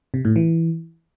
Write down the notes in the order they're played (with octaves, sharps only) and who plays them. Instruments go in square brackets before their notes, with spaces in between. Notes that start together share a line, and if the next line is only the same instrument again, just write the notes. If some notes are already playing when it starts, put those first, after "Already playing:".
[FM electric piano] C3
A2
E3